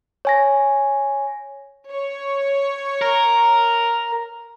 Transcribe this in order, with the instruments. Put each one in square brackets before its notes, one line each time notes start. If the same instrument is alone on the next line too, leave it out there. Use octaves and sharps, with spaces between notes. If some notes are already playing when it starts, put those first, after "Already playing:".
[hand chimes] C#5 G#5 A#6
[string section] C#5
[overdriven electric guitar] A#4